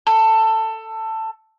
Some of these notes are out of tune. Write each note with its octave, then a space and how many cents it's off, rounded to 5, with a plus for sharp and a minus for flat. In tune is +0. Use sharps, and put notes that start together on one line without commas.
A4 +15